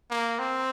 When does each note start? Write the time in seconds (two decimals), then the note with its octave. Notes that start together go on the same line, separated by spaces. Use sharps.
0.11 A#3
0.39 C4